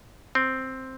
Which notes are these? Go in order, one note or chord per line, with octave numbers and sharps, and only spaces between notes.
C4